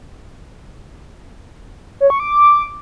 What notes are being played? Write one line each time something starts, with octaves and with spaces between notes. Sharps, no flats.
C#5
C#6
D6